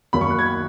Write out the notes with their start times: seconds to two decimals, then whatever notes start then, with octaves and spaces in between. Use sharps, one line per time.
0.13 F#2 D#3 A#3 B5
0.21 C#6
0.30 F#6
0.39 G#6